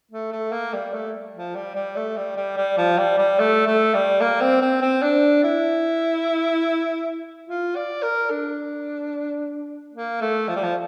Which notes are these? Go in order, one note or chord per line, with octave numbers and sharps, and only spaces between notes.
A3
A3
A#3
G3
A3
F3
G3
G3
A3
G3
G3
G3
F3
G3
G3
A3
A3
G3
A#3
C4
C4
C4
D4
E4
F4
D5
A#4
D4
A#3
A3
F3
G3
F3